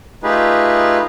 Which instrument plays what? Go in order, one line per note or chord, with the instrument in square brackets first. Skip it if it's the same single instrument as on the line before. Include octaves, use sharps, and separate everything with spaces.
[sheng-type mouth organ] A3 D#4 F4 G4 G#4 B4